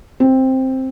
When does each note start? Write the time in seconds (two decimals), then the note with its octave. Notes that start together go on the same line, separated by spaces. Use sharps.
0.20 C4